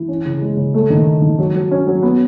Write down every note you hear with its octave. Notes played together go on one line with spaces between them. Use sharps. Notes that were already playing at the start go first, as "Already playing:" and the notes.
Already playing: E3
C#4
C#3
G#3
C#3
A3
D#3
D#4
D#3
F#3
F#3
C#4
F#3
B3